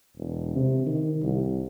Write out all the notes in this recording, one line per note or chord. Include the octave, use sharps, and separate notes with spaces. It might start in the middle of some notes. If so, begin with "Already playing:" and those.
E1
C3
D#3
C2